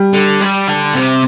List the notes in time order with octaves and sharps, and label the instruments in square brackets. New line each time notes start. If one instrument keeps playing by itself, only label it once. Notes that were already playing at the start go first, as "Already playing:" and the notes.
Already playing: [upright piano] G3
[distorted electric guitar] D3
G3
D3
C3